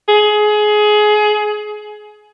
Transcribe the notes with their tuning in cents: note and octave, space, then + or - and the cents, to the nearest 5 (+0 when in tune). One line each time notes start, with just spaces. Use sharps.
G#4 +25